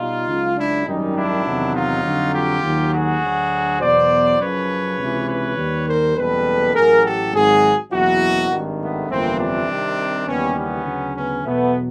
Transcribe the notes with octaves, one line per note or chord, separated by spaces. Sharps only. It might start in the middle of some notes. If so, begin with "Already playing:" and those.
Already playing: B2 G3 D#4 F4
C#2 C#3 F#3
D4 E4
G#1 F#2 D#3 G3 C#4 D#4
D4 E4
E2 C3 D#3 F#3
D#4 F4
F2 D3 F#3
F4 G4
D#2 D#3 F#3
F#4 G#4
D2 D3 F#3
E2 B2 F#3 C5 D5
F#2 C#3 F3 B4 C#5
C#2 C3 E3
B4 C#5
D#2 D#3 G3
A#4 C5
F#1 E2 B2 G3 A4 B4
A1 A2 F#3 G#4 A#4
G4 A4
G#1 G#2 D#3 F#3 F#4 G#4
F#1 E2 B2 F#3 E4 F#4
G#1 G2 D#3
A3 B3
G1 F2 C3 E3 A#3 C4
C4 D4
C2 C3 D#3
D#2 C#3 E3 G3 B3 C#4
B3 C#4
D2 C#3 F#3
B3 C#4
E2 B2 F#3 A3 B3